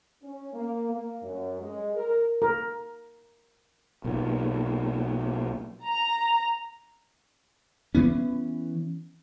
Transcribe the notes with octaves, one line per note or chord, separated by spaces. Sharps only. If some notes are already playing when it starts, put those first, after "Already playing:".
C#4
A#3
A#3
F#2
G#3
A#4
A#4
B1 A#2
A#5
E3 B3 C#4